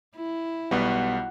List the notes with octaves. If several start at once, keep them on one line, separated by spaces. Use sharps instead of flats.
E4
B1 G3 B3 F#4